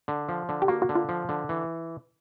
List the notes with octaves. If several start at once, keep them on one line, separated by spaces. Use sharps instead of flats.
D3
F3
D3
G4
A#3 F#4
F#4
D3
F4
F3
D3
E3